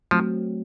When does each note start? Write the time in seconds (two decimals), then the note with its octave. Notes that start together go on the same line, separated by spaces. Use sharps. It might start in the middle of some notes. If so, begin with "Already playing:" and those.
0.11 F3 F#3 A3 C4